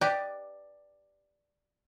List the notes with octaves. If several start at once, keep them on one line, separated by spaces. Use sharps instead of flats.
G4 B4 D5 D#5